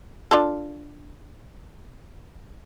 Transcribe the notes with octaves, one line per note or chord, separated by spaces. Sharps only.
D4 F4 A4